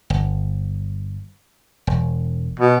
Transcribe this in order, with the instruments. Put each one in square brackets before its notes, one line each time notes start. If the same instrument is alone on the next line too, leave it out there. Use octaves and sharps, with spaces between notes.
[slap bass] G1
E1
[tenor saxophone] B2